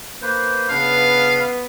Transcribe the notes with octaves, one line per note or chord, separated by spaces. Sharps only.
A#3 B4 C5
C#3 B3 D4 B4 F5